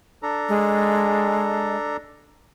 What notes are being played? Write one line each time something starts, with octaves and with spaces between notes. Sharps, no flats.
D4 A4 A#5
G#3